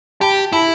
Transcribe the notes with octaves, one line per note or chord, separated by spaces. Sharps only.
G4 A5 B5
E4 A5 B5